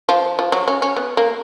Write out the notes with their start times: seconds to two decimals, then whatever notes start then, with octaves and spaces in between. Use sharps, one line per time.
0.09 F3
0.39 F3
0.52 F#3
0.68 C#4
0.82 C#4
0.96 B3
1.17 A#3